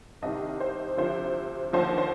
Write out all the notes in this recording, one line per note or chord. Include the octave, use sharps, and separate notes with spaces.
C2 C3 D#3 D#5
C5
D2 C3 F3 C5
D#2 D3 F3 C5
C5